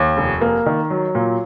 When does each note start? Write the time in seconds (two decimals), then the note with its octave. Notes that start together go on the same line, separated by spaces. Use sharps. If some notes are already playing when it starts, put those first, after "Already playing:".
Already playing: D#2
0.17 F1
0.41 A#3
0.66 D#3
0.90 F#3
1.15 A#2